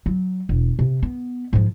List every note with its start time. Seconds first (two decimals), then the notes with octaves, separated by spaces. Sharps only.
0.06 F#3
0.49 E1
0.79 C3
1.02 B3
1.53 G#2 F3